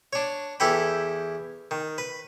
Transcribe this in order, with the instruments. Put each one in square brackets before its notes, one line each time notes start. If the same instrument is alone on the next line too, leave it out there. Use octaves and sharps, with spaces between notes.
[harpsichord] D4 C#5
E2 E4 G4 A4 G5 B5
D#3
B4